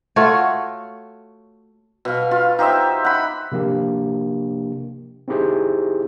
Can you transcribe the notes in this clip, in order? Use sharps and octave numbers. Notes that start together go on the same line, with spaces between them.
A3 F4 F#4 C#5
B2 F5
F4
D#4 G4 C5 E5
F#5 B5
C3 F3 A#3 D4 G4
C4 D#4 E4 G4 G#4 C5